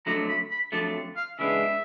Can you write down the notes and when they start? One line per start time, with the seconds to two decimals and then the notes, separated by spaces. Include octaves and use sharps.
0.06 F2 D3 F#3 A3 A#5
0.29 B5
0.51 B5
0.72 F2 D3 F#3 A3 A5
1.16 F5
1.39 C#3 E3 G#3 B3 D4 E5